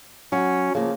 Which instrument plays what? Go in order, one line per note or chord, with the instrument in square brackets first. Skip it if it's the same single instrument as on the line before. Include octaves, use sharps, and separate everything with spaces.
[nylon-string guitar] F#3 [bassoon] C#4
[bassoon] C#3 [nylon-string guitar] F3 A#3